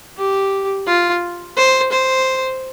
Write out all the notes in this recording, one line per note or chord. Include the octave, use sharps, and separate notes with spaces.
G4
F4
C5
C5